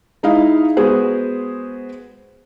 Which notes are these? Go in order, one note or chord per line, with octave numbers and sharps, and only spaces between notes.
G#3 D#4 E4 D#5 F5
G#3 B3 F#4 G#4 C5